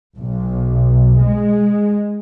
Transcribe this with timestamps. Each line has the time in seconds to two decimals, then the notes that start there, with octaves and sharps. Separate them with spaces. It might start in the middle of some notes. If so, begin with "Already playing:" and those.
0.17 B1
1.19 G#3